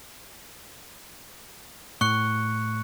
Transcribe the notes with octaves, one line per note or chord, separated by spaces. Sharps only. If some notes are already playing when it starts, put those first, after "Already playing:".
A2 C#6 F#6 C#7